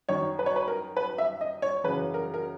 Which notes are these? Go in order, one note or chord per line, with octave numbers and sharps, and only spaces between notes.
F#2 D#3 C#5
B4
C#5
B4
A#4
B4
E5
D#5
C#5
F#2 C#3 E3 B4
A#4
A#4